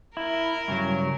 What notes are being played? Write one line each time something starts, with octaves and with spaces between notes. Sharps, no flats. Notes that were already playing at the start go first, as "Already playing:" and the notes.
E4 A#4
G2 C#3 F#3